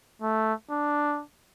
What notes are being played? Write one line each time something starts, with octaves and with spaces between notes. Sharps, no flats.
A3
D4